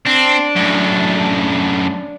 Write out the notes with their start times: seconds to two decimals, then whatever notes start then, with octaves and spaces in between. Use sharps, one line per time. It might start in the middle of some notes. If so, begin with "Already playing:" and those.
0.06 C4 D4
0.56 F#2 A2